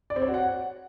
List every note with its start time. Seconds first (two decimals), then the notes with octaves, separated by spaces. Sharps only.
0.10 D5
0.16 C4
0.22 C#5
0.28 F#4
0.34 F#5